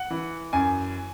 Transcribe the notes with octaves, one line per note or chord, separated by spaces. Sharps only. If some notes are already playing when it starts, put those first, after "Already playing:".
Already playing: F#5
E3
F#2 G#5